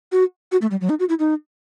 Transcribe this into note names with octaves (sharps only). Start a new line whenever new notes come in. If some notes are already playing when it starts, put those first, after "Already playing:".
F#4
F#4
A3
G3
F#3
D#4
F#4
E4
D#4